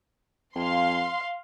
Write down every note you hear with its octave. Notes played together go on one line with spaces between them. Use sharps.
F2 F5 C6